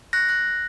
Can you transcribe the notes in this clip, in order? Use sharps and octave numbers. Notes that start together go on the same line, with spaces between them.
F#6 A#6
F#6 A#6